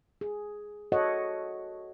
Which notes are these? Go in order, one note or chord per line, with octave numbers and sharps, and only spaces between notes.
G#4
F#4 A4 C#5 D#5 F#5